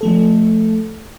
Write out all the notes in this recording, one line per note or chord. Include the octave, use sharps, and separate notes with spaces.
F3 A3 A4